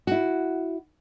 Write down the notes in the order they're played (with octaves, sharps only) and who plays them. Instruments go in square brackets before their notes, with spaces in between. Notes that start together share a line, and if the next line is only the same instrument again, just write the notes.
[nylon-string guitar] E4 F#4